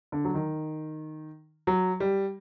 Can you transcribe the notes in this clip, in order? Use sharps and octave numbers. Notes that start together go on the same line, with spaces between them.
D3
F#3
D#3
F#3
G3